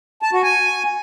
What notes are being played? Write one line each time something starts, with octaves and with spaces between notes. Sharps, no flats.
A5
F#4
G#5